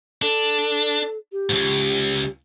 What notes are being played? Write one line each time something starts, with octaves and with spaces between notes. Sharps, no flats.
D4 A4
G4
C#2 G#2